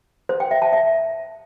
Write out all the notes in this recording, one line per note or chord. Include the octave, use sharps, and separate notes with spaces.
C5
G5
E5
A5
E5